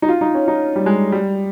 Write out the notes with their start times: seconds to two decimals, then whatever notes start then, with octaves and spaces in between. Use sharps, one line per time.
0.02 D#4
0.09 F4
0.21 D#4
0.35 C#4
0.48 D#4
0.76 G3
0.86 G#3
1.12 G3